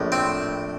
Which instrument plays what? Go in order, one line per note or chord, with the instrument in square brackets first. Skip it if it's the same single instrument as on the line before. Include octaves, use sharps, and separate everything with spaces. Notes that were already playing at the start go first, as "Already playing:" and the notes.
Already playing: [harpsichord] A#1 A2
C4